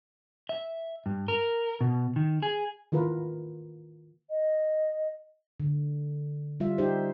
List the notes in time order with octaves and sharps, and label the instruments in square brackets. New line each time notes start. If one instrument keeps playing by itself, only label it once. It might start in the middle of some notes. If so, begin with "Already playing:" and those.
[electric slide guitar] E5
G2
A#4
B2
D#3
G#4
[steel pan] D#3 E3 F4 A#4 B4
[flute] D#5
[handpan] D3
G3 F4 E5
D#4 G4 C5